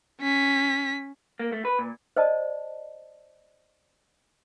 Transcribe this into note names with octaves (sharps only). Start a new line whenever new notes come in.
C#4 B6
A#3
A3
B4
A#2
C5 D5 D#5 A5